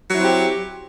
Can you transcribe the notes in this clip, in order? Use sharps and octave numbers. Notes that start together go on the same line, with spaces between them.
F#3 C4 E4 G4